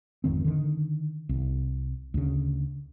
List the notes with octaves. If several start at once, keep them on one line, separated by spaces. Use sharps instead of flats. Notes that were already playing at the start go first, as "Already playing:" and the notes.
G#1 F2 D#3 C4
D3 D#3
C2
D2 C#3